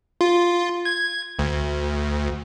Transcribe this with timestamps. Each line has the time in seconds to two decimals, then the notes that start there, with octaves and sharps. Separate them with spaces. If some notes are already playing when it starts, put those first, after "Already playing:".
0.21 F4
0.85 G#6
1.39 D2